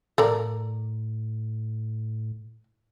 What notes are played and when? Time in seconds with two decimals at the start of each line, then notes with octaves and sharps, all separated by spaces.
0.18 A2 A4 A#4 D5